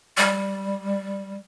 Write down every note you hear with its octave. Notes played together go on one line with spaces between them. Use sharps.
G3